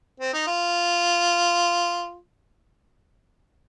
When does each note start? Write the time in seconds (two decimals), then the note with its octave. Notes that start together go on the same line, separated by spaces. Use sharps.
0.20 C4
0.34 D#4
0.47 F4